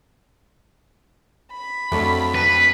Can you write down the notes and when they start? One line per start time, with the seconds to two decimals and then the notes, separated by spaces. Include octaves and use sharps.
1.53 B5
1.92 F2 F#3 A3 D4
2.35 D4 B4